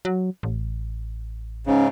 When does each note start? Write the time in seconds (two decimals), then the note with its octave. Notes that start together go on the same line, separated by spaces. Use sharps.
0.05 F#3
0.43 A1
1.67 G#2 C#3 C#4